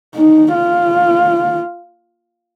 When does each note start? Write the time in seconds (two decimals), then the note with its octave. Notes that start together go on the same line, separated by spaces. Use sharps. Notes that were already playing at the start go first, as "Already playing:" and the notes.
0.16 D#4
0.55 F4